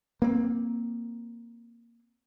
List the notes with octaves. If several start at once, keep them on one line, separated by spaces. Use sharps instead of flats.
A#3 C4